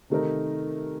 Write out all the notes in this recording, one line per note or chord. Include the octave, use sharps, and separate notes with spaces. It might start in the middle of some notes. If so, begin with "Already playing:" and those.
C3 D#3 A3 D#4 A#4